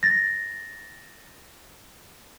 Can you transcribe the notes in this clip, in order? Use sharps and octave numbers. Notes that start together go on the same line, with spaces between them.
A6 A#6